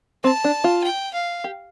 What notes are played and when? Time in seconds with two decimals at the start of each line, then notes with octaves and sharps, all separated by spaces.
0.24 C4 A5
0.44 D4
0.64 F4
0.84 G5
1.14 F5
1.44 G4